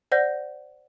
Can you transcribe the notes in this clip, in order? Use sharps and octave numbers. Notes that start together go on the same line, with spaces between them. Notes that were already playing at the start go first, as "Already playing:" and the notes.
C5 D5 F#5 G6 A#6